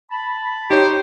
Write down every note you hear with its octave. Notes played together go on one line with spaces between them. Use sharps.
A5 B5
D#4 G4 C5 C#5